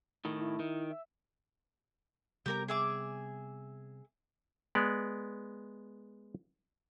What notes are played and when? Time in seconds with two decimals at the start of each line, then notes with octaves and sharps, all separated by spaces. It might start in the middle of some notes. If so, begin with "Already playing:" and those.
0.25 A2 D#3
0.39 E4
0.59 D#3
0.91 E5
2.46 C3 G3 B3 G4 A#4 A#5
2.68 G#4 E5 D6
4.75 G#3 B3 D5